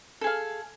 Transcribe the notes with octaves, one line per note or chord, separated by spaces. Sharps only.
G#4 A4 F5